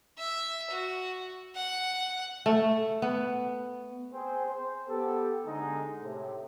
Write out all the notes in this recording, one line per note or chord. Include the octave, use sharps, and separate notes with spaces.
E5
F#4
F#5
A3
B3
C4 G#4 C5
C5
B3 G4 A4
D3 G#3 D#4
A2 C3